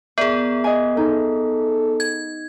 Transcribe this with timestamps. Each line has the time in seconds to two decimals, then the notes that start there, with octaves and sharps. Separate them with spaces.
0.18 B3 G#4 A#4 D5
0.64 D#5 G#5
0.97 D#4 A4
2.00 G#6